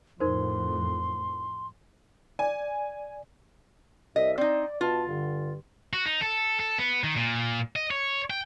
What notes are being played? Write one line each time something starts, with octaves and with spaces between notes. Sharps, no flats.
F2 A2 D#4 A#4 C5 C6
D5 G#5
C2 D#5 E5
C4 D#4 D5
B2 F4 A5
G2 D3
F#4
D#4
A4
A4
B3
D#3
A#2
D#5
C#5
G5